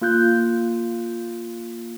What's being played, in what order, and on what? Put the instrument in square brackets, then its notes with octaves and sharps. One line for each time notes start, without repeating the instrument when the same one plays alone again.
[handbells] A#3 F4 F#6 G6